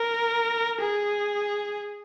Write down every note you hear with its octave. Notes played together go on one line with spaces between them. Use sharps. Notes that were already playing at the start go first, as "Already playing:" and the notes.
Already playing: A#4
G#4